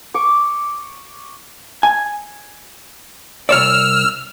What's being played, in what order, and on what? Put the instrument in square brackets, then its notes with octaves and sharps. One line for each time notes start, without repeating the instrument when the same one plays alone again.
[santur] C#6 D6
[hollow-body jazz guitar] G#5
[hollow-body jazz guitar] C2 C#5 D5 [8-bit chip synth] E6 F6